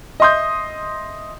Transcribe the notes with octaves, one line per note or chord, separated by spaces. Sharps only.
D#5 E5 C6 D#6 G6